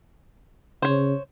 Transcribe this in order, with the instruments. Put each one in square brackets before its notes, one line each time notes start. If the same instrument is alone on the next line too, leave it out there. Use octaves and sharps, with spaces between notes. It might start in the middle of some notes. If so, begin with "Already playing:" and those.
[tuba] C#3 [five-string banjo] C5 C#5